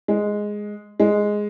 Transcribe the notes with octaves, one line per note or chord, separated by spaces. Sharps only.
G#3
G#3